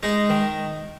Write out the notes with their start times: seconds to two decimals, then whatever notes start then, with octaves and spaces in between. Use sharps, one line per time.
0.03 G#3 D#4
0.29 D#3